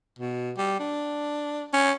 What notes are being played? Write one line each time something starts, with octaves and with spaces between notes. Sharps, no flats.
B2
G3
D4
C#4